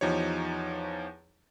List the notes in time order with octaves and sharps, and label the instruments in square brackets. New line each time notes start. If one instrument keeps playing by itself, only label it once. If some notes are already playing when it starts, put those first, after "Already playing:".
[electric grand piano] E2 F3 D#4 G4 C#5